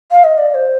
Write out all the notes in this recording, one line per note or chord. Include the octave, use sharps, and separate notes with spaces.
F5
D#5
D5
D5
C5